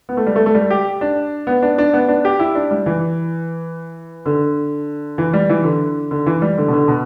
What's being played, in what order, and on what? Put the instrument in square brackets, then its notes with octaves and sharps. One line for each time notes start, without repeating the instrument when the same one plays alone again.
[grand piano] B3
A3
G3
A3
A3
G3
G4
D4
B3
D4
D4
B3
D4
G4
E4
D4
G3
E3
D3
E3
G3
E3
D3
D3
E3
G3
D3
B2
D3
B2